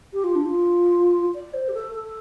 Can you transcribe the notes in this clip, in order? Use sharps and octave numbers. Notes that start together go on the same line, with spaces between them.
G4
F4
D4
F4
D5
C5
G4
A4
A4